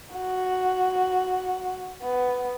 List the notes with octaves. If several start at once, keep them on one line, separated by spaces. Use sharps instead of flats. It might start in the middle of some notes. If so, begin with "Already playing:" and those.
F#4
B3